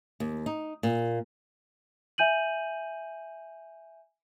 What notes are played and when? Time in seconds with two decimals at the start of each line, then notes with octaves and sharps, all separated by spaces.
0.20 D#2
0.46 D#4
0.83 A#2
2.18 E5 G#5 G6 D#7 F#7